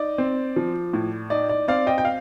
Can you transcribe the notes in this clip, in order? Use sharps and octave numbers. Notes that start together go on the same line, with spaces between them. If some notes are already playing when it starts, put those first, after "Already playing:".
Already playing: D#4 D5
C4
F3
A2
D#4 D5
D5
C4 D5 F5
D#5 G5
G5
F5